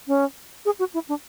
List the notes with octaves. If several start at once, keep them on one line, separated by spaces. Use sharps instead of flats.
C#4
G#4
F#4
E4
D4